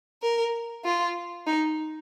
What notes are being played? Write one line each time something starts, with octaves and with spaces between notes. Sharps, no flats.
A#4
F4
D#4